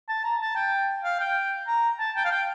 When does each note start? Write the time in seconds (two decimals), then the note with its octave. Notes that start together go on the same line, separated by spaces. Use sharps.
0.09 A5
0.24 A#5
0.41 A5
0.56 G5
1.04 F5
1.20 G5
1.68 A#5
1.99 A5
2.16 G5
2.25 F5
2.31 G5